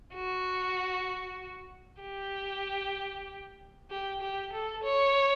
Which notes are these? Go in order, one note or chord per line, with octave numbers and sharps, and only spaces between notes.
F#4
G4
G4
G4
A4
C#5